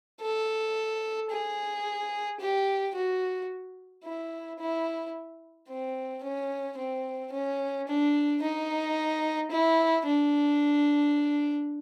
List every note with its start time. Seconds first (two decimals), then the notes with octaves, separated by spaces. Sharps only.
0.21 A4
1.31 G#4
2.40 G4
2.95 F#4
4.04 E4
4.60 E4
5.68 C4
6.23 C#4
6.78 C4
7.32 C#4
7.88 D4
8.42 D#4
9.52 E4
10.06 D4